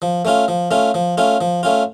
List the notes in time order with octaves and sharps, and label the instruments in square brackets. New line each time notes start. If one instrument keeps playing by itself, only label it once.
[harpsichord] F3
A3 C#4 F4
F3
A3 C#4 F4
F3
A3 C#4 F4
F3
A3 C#4 F4